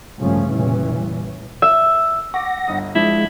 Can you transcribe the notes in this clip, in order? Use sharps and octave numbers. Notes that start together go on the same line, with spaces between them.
A1 G2 C#3 F3 A3 C#4
F1 A#2 E3 G3 C#4
E5
F#5 C#6 D6 A#6
G1 D#5 D#6
F3 G#3 D4 E4